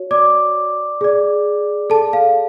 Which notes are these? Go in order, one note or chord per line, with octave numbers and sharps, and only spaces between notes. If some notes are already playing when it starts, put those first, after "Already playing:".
Already playing: F#4 C#5
D5 D6
G#4 D5
A4 A5
F5